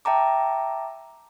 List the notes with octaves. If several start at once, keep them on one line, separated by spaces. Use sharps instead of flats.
E5 G5 A5 A#5 D6